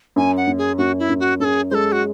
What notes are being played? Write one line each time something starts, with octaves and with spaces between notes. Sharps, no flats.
F#2 G#5
F#5
F#2
G#4
F#2 F#4
E4
F#2
F#4
F#2 G#4 A4
G#3 A4 C5
F#4